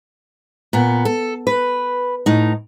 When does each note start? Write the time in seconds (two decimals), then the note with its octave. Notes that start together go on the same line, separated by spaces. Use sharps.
0.73 A#2 B3
1.05 A4
1.47 B4
2.26 A2 D#4